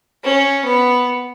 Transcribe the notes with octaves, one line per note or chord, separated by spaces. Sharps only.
C#4
B3